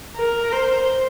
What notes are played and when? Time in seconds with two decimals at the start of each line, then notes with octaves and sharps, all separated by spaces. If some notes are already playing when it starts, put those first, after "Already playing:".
0.16 A#4
0.52 C5